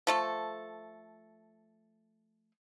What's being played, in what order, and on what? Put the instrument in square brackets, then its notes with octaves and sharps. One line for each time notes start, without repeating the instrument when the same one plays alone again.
[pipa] F3 A3 A4